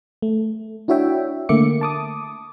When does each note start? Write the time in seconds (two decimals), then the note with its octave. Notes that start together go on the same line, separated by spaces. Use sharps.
0.22 A3
0.88 D4 E4 F#4 C#5 E5 G5
1.49 D3 A3 A#3 E5 D6 C#7
1.81 A5 D6 D#6